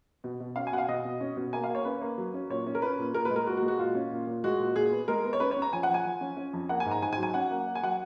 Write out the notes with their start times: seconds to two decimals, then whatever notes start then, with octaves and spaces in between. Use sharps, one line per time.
0.24 B2
0.40 B2
0.56 C#4 F5
0.67 G#5
0.72 B2 F#5
0.78 F5
0.88 B2 D#5
1.05 B2
1.21 C#4
1.37 B2
1.53 A#3 G#5
1.64 F5
1.69 A#3
1.75 C#5
1.85 C#4 B4
2.01 A#3
2.18 F#3
2.34 C#4
2.50 A#2 C#5
2.67 C#4
2.75 A#4
2.82 C#4 B4
2.99 A#2
3.14 A#2 A#4
3.25 B4
3.30 G#3
3.36 A#4
3.46 A#2 F#4
3.57 F#4
3.62 G#3
3.68 F#4
3.79 A#2 F4
3.95 C#4
4.11 A#2
4.27 A#2
4.44 G#3 F#4
4.60 A#2
4.76 A#2 G#4
4.92 B3
5.08 G#3 A#4
5.24 B3
5.33 C#5
5.40 C#4 B4
5.51 C#5
5.57 C#4
5.62 A#5
5.73 F3 G#5
5.83 F#5
5.89 F3
5.94 G#5
6.05 F3
6.21 C#4
6.37 C#4
6.53 F2
6.69 A#3 F#5
6.80 G#5
6.86 G#2
6.91 A#5
7.02 G#2 G#5
7.13 G#5
7.18 F#3
7.23 G#5
7.34 C#4 F#5
7.50 A#3
7.67 A#3
7.75 G#5
7.83 F#3 F#5